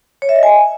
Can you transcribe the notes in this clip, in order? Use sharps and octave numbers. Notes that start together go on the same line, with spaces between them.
C#5
E5
D#5
G#5